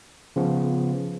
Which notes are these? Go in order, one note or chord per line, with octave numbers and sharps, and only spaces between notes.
C#3 F3 B3